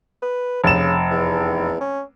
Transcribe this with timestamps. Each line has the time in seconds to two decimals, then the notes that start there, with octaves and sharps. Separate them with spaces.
0.22 B4
0.64 F1 C#3 E7
1.11 E2
1.81 C#4